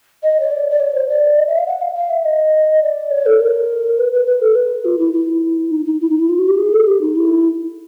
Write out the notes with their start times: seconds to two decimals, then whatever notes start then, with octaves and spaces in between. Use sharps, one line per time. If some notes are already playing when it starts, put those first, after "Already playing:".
0.23 D#5
0.40 C#5
0.51 D5
0.70 D5
0.80 C#5
0.94 C5
1.09 D5
1.38 D#5
1.47 E5
1.57 F5
1.67 F#5
1.81 F5
1.95 F5
2.10 E5
2.25 D#5
2.82 D5
3.11 C#5
3.26 A4
3.40 A#4
3.98 B4
4.13 B4
4.27 B4
4.41 A4
4.55 B4
4.85 F4
4.99 E4
5.14 E4
5.71 D#4
5.86 D#4
6.00 E4
6.10 D#4
6.19 E4
6.29 F4
6.38 F#4
6.48 G4
6.58 G#4
6.73 A4
6.87 G4
7.01 D#4
7.16 E4